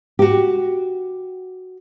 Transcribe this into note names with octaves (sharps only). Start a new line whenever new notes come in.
F#4 G4